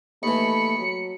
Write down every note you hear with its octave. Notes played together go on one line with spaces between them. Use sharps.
D#2 E3 A3 B5 C#7
F#3